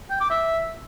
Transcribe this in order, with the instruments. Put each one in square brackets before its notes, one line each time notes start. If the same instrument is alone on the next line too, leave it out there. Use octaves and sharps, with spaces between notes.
[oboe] G5
D6
E5